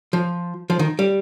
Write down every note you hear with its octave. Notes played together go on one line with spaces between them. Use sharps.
F3
F3
D#3
G3